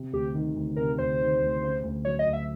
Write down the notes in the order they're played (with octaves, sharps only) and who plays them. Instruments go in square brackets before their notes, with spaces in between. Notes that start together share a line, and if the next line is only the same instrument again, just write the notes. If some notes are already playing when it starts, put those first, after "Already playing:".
Already playing: [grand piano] C3
[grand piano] D2 [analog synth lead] G4
[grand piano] D#3
D2
[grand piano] C3 [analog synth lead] A#4
[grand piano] D2 [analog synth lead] C5
[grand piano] D#3
D2
C#3
D2
[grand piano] F#3 [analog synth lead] C#5
[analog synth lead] D#5
[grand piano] D2
[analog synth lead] E5